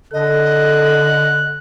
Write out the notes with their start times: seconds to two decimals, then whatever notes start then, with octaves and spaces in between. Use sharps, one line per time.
0.13 D3 A4 D#5 F#6